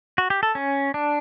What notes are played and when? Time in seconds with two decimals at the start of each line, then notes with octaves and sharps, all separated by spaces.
0.18 F#4
0.30 G4
0.43 A4
0.55 C#4
0.94 D4